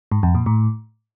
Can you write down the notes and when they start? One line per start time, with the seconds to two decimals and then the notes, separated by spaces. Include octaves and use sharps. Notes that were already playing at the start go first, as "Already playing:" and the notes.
0.12 G#2
0.23 F2
0.35 A#2
0.46 A2